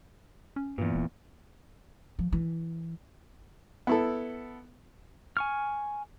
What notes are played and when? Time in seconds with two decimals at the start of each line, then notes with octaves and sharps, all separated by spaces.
0.56 C#4
0.78 E2 G2 A#2
0.94 E1
2.19 F3
2.32 E3
3.87 B3 E4 A4
5.37 G#5 C#6 F6